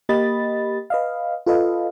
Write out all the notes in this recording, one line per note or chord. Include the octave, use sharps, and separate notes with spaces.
A#3 G4 D#5 B5 A6
B4 D#5 F5
F4 A4 B4 D#5 F5